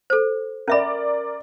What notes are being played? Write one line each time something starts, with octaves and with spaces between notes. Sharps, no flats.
A4 C5
C#4 A#4 D5 E5 B5